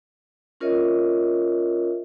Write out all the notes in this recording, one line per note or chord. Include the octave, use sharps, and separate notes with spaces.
C#4 F4 A#4 C#5 D#5 E5